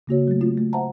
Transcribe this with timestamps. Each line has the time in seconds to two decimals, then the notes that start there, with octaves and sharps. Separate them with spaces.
0.07 C#3 A#3 F#4 C#5
0.28 F#3 A3
0.41 A3 A#3 C4 F4
0.58 A3
0.73 C5 E5 F#5 A5 A#5